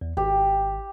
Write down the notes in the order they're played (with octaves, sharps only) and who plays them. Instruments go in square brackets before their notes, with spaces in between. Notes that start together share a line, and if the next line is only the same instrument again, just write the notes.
[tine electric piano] E2
[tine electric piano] G#1 [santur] G4